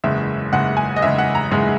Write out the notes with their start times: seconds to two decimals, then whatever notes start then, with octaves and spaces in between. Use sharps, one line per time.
0.04 F#1 E2 C#3 G#3 E5
0.52 F#1 E2 C#3 G#3 F#5
0.77 G#5
0.96 D#5
1.01 F#1 E2 C#3 G#3 E5
1.18 F#5
1.35 A#5
1.51 F#1 E2 C#3 G#3